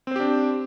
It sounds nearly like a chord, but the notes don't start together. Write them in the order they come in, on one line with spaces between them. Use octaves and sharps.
C4 C5 G4 D4